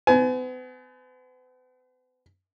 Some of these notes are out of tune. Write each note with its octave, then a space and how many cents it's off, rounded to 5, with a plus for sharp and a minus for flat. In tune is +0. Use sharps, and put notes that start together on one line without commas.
B3 +45 G#5 +30